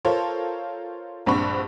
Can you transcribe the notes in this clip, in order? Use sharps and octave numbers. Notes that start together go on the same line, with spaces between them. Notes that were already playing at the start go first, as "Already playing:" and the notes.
F4 A4 A#4 C5 C#5
A#1 G2 C4 F#5 B5 C#6